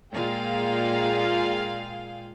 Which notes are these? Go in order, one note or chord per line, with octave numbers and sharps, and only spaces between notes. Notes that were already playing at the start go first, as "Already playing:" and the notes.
A#2 G#3 F4 G#4 F5 G5